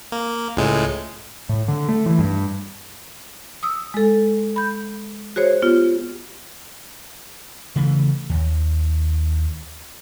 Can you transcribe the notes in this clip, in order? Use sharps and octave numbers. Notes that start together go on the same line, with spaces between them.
A#3
C#2 A2 G#3
A2
D3
A3
E3
G2
D#6 E6
G#3 A4
B5 G6
F#4 G#4 C5 C#5
B3 F4 G4
C#3 E3 A3
D#2